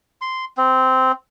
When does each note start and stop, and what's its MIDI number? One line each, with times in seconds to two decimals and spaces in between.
0.21 0.45 84
0.57 1.12 60